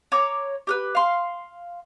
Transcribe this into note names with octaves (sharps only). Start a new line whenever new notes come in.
C#5 A#5 D6
G4 A#4 B4
F5 C6